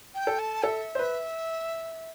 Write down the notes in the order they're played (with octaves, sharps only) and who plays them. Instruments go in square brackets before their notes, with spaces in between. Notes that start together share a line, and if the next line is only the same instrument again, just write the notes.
[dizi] G5
[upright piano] A4
[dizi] A5
[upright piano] A4 [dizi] E5 F5
[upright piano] C5
B4